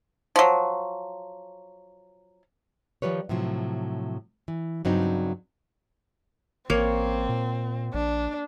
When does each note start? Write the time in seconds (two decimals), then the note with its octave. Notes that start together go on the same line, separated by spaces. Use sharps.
0.36 F3 F#3
3.02 D#3 F3 G3 B4 C#5
3.29 A2 C3 F3 F#3
4.48 E3
4.85 G2 C#3 F#3 C4 D4 D#4
6.70 A1 A#3 C4 C#5
7.29 A#2
7.94 A#1 D4